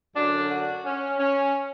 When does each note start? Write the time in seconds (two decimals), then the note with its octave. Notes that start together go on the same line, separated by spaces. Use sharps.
0.16 F#2 D3 F#3 D4
0.51 F#4
0.85 C#4
1.19 C#4